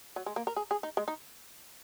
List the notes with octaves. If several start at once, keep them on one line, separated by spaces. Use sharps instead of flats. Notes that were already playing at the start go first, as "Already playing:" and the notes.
F#3
G#3
A#3
A#4
G#4
G#4
D#4
G#3
D#4